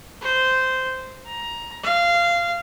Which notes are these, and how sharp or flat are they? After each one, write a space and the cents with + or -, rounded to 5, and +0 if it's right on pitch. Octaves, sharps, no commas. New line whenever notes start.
C5 -10
A#5 +15
F5 -15